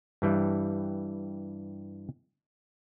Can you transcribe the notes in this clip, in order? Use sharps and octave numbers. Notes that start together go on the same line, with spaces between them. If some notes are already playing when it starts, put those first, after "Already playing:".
G2 E3 G3